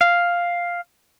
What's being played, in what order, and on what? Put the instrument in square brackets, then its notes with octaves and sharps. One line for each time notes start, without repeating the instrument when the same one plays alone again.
[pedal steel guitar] F5